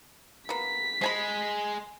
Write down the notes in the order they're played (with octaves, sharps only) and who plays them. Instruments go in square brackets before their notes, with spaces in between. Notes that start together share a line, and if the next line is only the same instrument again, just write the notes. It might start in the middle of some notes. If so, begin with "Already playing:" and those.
[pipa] A#3 B3 [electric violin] B6
[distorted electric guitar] G#3 [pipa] C5 G#5 B5